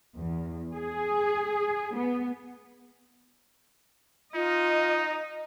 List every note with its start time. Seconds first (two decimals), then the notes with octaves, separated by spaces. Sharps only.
0.16 E2
0.74 G#4
1.95 B3
4.34 D#4 F4 D#5